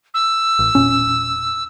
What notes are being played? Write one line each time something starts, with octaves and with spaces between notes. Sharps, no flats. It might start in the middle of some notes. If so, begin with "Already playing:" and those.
E6
A1
E1 A#2 C#4